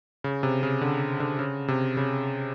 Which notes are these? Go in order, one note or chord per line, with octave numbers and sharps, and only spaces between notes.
C#3
C3
C#3
D3
D3
C#3
C3
C#3